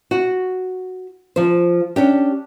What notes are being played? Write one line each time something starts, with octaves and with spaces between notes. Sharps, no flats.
F#4
F3 C5
C#4 D4 G4